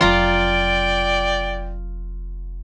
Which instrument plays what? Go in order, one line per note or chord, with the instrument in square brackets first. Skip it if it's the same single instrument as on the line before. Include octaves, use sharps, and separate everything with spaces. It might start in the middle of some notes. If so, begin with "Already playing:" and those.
[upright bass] F1 F#3 [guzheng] F4 A#5 [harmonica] D5 G5